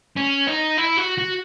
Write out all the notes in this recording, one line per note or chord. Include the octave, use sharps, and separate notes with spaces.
C#4
D#4
E4
F#4
F#4